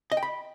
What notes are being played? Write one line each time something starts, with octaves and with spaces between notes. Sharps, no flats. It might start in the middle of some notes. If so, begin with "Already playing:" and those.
D#5
G5
B5